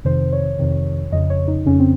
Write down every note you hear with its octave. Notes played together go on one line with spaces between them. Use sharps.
F2 C3 D#3 C5
C#5
F2 C3 D#3
F2 C#3 D#5
C#5
D#4
F2 C#3 C#4
C4